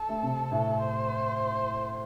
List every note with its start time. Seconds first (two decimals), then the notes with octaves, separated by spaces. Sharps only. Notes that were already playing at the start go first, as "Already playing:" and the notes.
Already playing: A4
0.09 A3
0.23 C3
0.51 A2
0.80 C5